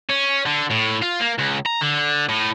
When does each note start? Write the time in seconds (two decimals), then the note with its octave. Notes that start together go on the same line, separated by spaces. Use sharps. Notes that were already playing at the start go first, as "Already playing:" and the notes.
0.10 C#4
0.46 D3
0.71 A2
1.02 F4
1.20 A#3
1.38 C#2
1.66 A#5
1.81 D3
2.29 A2